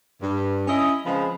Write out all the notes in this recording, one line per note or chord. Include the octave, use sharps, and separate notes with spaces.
G2
C#4 E4 D#5
C#3 F3 G#3 C4 B4